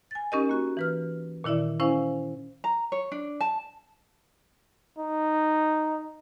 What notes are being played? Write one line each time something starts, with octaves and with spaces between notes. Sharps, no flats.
G#5 A6
C#4 D#4 G4 A#4 D#5
A#3 F#4 C#6
E3 B4 F6
A#2 D#3 E4 D5 E5
C#4 E4 C5 F5 G#5
A#5
C#5
D4
A5
D#4